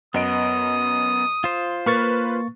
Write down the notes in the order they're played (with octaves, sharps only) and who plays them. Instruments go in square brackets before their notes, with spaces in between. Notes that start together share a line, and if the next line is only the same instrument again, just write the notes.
[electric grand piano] F#2 D#5 D7 [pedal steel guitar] B3 [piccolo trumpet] D#6
[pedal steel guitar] F4 C5
[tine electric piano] A#3 C#6 A6 [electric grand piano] B4 F6